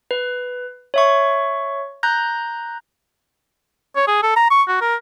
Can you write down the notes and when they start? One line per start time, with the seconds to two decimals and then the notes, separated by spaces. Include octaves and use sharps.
0.11 B4
0.94 C#5 E5 C#6
2.03 A#5 F#6 G6 A#6
3.96 C#5
4.07 G#4
4.23 A4
4.36 A#5
4.50 C#6
4.68 F#4
4.81 A#4